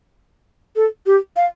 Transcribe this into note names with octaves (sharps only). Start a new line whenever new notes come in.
A4
G4
F5